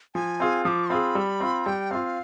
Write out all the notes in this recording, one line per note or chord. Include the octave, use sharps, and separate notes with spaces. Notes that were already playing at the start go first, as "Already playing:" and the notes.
F3 G#5
C4 F4 G#4
F3 D6 D#6
C4 F4 G#4 B5
G3
C4 F4
G3 G5
C4 F4 F5